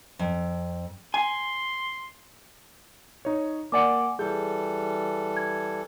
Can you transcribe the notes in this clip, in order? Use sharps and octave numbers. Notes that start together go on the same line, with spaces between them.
F2
G#5 C6
D#4 C#5
A#3 D5 F#5 G#5 D6 C#7
E3 G3 G#4 A4 G6
G#6